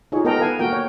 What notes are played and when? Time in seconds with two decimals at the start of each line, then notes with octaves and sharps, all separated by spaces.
0.12 D#4 F4 G4 G#4 C#5
0.25 B3 A4 A#4 D#5 G5 A#5
0.39 E4 A4 B4 F5 G#5
0.59 A#3 F#4 A#4 G5
0.73 C#5 G5